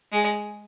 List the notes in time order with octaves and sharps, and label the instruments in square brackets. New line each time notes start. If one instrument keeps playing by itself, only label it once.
[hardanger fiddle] G#3